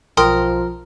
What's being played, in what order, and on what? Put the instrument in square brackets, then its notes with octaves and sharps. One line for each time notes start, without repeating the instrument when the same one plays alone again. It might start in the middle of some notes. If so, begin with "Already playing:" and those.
[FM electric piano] B1 [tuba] F3 [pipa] A#4 [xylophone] G5 C6 D#6